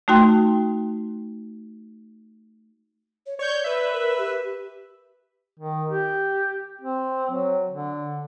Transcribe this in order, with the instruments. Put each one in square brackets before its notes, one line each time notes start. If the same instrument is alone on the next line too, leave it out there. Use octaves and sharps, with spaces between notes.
[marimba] A3 D#4 F#4 G5 C6
[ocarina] C#5
[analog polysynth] C#5 C#6 G6 [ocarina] D5
[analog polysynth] B4 E5
[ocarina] A#4
G4
[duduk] D#3
G4
C4
F#3
D3